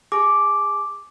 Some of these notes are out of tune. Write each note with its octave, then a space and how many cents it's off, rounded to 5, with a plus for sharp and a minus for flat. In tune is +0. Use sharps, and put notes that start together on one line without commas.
G#4 -30 G#5 +40 D6 +0